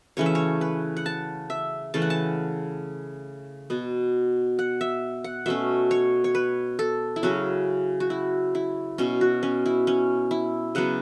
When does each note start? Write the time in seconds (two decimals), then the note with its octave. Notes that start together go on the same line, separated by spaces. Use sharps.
0.17 C#3 E3 A3 C#4 C#5
0.26 E5
0.35 C#5
0.61 B4
0.97 F#5
1.06 A5
1.50 E5
1.94 C#3 E3 A3 A5
2.02 F#5
2.10 A5
3.70 B2 B3
4.59 F#5
4.81 E5
5.24 F#5
5.46 B2 A3 C#4 E5
5.91 C#5
6.24 C#5
6.35 B4
6.79 A4
7.16 E4
7.23 C#3 F#3 C#4 F#4
8.00 F#4
8.10 E4
8.55 E4
8.98 B2 B3 C#4
9.21 F#4
9.43 C#4
9.66 E4
9.87 C#4
10.31 E4
10.75 C#3 F#3 B3 F#5